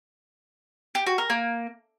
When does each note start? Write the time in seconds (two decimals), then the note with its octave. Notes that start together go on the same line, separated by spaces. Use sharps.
0.95 G4
1.07 F#4
1.18 A#4
1.30 A#3